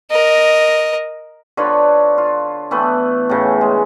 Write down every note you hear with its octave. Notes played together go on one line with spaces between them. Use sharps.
A#4 D#5
D3 F4 B4 C#5
F4
E3 A3 B3 B4
A2 C#3
G#3